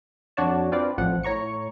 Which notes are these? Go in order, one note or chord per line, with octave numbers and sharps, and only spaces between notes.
F2 D4 F#4 C#5 D5 A5
C4 D4 F4 B4 C5 D5
A1 F2 F3 F#5
A2 C#5 A#5 C#6 C#7